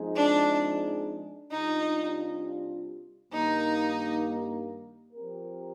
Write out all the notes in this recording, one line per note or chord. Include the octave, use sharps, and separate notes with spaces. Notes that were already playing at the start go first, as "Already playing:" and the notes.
Already playing: F3 G#3 C4 D#4 G#4
D4
C3 G3 D4 D#4 F4
G2 D#3 A#3 D#4
F3 C4 G4 A#4